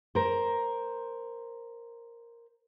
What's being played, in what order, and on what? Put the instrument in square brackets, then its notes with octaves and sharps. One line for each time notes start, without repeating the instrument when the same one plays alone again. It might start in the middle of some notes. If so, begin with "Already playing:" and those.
[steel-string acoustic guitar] A#4 C5